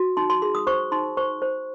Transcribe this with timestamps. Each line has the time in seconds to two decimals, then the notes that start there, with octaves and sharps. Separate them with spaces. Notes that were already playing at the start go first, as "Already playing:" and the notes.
Already playing: F#4
0.17 D#4 C6
0.30 C6
0.42 G#4 C6
0.55 D#6
0.67 C5 C#6
0.92 D#4 C6
1.17 C5 C#6
1.42 C5